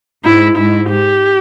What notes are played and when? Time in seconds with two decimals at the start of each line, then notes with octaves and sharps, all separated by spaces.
0.25 G#2 E4
0.57 G#2 E4
0.90 G4